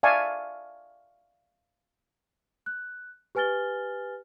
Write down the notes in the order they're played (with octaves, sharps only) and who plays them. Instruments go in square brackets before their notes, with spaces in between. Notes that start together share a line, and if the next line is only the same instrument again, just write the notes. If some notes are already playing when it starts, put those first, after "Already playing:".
[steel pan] D5 E5 F5 G#5 A5 C#6
[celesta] F#6
G4 B4 G#5 F6 A6 G7